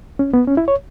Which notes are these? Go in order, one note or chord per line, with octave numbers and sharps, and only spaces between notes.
C#4
B3
C#4
E4
C#5